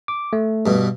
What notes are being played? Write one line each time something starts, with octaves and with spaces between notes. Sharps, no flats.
D6
A3
G2 B2